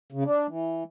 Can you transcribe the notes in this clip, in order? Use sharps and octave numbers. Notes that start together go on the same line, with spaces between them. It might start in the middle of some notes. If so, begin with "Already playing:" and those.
C#3
D4
E3